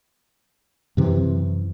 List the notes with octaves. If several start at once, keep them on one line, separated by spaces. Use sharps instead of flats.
F#2 C3 E3